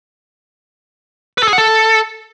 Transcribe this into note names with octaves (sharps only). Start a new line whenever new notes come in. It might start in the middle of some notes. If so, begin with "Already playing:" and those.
B4
A4
G#4
F#5
A4